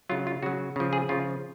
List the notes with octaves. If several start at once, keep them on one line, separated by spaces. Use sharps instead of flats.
C#3 F#3 F4
F4
C#3 F#3 F#4
C#3 F3
G#4
C#3 F3 F4